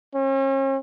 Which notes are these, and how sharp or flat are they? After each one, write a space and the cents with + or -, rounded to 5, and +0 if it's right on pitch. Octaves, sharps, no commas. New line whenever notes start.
C#4 -40